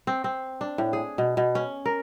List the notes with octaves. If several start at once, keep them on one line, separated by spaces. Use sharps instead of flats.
C4
C4
D4
A2
G#4
B2
B2
C#4
A#4